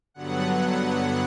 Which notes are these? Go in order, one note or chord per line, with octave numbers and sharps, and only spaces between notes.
G2 D3 F#3 B3 F#5